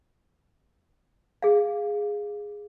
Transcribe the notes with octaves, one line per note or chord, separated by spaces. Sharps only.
G#4 F5